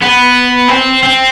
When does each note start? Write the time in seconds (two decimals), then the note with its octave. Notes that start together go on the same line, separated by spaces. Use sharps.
0.02 B3
0.68 C4
1.03 C4